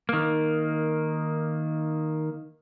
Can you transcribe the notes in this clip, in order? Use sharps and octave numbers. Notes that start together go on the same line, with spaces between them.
D#3 A#3